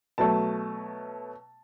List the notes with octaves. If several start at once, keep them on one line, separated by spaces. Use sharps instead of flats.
B2 F#3 A3 A5